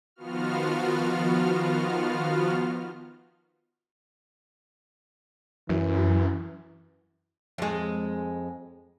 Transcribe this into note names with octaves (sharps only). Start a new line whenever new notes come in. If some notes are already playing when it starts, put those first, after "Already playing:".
D#3 F3 B3 F4 F#4 F6
F#2 E3
F2 G#3